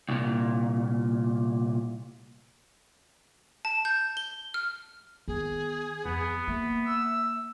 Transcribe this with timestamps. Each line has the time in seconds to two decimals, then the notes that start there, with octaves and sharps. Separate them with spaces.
0.09 C2 A#2
3.65 A5
3.85 G6
4.17 G7
4.54 F6
5.28 D#3 B3 G#4
6.05 F2 B3
6.48 A#3 E5
6.85 E6